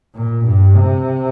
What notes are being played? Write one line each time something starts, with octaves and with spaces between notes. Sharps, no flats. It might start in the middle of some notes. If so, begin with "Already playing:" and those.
A#2
G2
C3